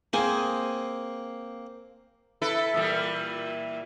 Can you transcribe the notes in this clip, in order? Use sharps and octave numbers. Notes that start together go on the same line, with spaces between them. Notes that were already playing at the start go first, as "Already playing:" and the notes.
A#3 C4 G#4 C5 G#5
E4 A4 B4
A#2 E3 G3